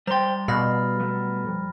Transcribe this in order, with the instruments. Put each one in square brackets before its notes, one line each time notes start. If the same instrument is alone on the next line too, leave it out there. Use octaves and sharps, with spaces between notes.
[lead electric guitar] G3 C6 [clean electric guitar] C5 G5 [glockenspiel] A#5 A6
[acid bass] B2 [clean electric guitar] G#4 D5 F5 [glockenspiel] B5 F6 A#6
[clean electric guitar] F#3 A3 B3
F2